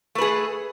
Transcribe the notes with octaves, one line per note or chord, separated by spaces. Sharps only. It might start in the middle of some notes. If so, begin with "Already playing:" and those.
A3 G#4 B4